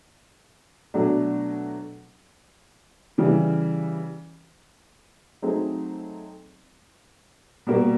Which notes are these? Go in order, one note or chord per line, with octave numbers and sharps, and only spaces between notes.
B2 F#3 A3 D4
C#3 E3 G3
F#3 A3 C4 D#4 G#4
B2 G3 A#3